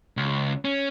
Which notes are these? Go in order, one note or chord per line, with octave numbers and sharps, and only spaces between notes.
C#2
C#4